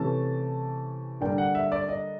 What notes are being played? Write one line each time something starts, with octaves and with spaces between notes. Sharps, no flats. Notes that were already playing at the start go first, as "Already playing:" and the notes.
Already playing: C3 E3 A3 C#4 A5
D3 G3 A#3 D4 G5
F#5
E5
D5
D#5